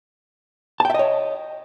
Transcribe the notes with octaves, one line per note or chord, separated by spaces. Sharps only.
C#5 D#5 E5 G5 A5